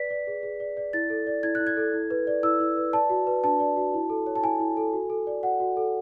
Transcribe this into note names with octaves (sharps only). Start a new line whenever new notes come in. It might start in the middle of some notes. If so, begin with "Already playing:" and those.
Already playing: B4 D5 B6
D5
G#4
G#4
D5
D5
E4 A6
A4
D5
E4 G#6
F#6
E4
G#6
A4
E4
B4
D5
E4 E6
E4
B4
D5 A5
F#4
B4
D4 A5
D5
F#4
E4
A4
C#5
A5
E4 G#5
E4
A4
F#4
A4
D5
F#4 F#5
F#4
A4